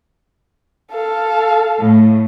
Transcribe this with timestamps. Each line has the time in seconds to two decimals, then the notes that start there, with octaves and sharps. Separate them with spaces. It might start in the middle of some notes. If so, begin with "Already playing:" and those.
0.92 A4 F5
1.79 A2